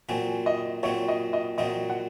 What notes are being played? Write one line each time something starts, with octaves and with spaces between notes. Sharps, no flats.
A#2 F#3 C4 G#5
D#5
A#2 F#3 C4 C#5
D#5
D#5
A#2 F#3 C4 D#5
F#5